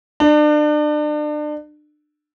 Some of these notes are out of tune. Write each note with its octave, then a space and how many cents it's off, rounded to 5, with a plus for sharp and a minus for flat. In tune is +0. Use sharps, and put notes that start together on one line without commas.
D4 +35